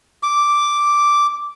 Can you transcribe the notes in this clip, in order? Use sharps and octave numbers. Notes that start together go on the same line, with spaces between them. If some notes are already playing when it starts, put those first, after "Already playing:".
D6